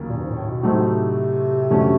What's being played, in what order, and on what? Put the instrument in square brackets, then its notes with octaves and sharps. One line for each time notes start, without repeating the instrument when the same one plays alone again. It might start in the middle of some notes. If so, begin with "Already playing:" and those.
Already playing: [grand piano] D#2 C#3 F#3 A#3
[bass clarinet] A#2
G2
G#2
A#2
A2
B2
[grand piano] A2 F#3 A3 C4 D#4 [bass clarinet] C3
[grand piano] F2 D3 F#3 A3 C#4